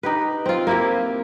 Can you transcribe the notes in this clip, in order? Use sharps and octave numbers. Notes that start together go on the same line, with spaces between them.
D#4 G4 B4
C4 F4
A#3 E4 G4